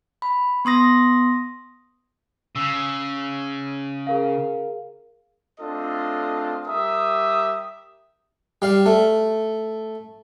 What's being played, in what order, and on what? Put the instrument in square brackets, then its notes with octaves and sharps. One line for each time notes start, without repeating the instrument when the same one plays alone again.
[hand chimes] B5
B3 C6 D#6 A#6
[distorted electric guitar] C#3 [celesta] E6
[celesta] G#4 A#4 F5
[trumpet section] A3 C4 D4 F4 A4 D#5
G3 G4 A#4 E5 D#6
[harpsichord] G3 F5
A3